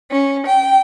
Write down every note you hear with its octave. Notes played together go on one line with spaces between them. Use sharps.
C#4
G5